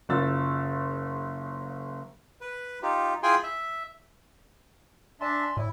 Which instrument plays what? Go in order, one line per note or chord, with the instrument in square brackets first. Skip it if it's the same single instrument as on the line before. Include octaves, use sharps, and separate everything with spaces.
[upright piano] F#1 C#3 F4 F#5 E6 A6
[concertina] B4
D#4 F4 G4
E4 F4 G#4 G5 G#5 C6
E5
[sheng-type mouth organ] D4 E5 A5 [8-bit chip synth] D5 G#5 C6
[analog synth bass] A2 [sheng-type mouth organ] E4